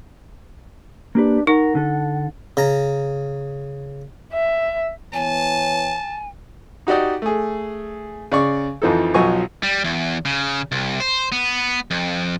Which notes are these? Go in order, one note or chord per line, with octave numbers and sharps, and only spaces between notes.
A#3 D4 G4 B4
D#4 A#4 F#5
D3 A4
C#3 A#5
E5
E3 B3 C#5 G#5 A5
D#4 F#4 G4 D5 D#5
A3 G#4
C#3 D5 C#6
F2 E3 F3 D#4 A4
B1 F3 F#3 D#5 G#5 C#6
G3
E2
C#3
C2
C5
B3
F2